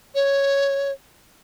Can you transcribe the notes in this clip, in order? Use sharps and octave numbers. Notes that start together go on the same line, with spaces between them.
C#5